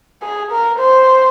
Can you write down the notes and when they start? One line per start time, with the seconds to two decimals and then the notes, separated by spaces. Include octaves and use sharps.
0.22 G#4
0.51 A#4
0.79 C5